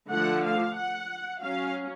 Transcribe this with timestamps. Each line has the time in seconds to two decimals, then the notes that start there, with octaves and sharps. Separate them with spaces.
0.11 D3 F3 A3 F#5
0.43 F5
0.76 F#5
1.40 F#3 C#4 F5